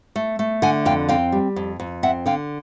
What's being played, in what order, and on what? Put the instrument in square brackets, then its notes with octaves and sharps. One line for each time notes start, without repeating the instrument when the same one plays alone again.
[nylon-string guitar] A3
A3
D3 F#5 G#5
F2 F5 G5
C4 F5 G5
G3
F2
F2
C4 E5 F#5
D3 F5 G5